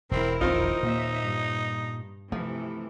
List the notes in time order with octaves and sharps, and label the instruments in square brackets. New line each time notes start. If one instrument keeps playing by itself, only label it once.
[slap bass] E1 [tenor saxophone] C4 [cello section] E4 A#4
[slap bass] E1 A#1 D#3 [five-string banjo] C4 F4 [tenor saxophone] D#4
[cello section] D#2 E5 [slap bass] A#2
[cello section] G2
[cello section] C3 E3 [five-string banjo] F3 [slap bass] A3